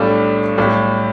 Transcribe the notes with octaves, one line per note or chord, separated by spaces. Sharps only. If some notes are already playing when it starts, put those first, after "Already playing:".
Already playing: B1 A2 G3 D4 A4
B1 A2 G3